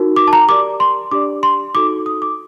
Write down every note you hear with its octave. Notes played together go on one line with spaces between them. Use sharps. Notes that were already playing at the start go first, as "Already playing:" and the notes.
Already playing: D#4 F#4 A#4
D6
A5
A#5
G4 A#4 D5 D6
C6
D4 G4 D5 D6
C6
D#4 F#4 A4 D6
D#6
D6